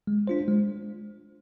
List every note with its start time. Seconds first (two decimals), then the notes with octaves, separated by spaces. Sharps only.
0.07 G#3
0.27 D4 F4 C5
0.48 G#3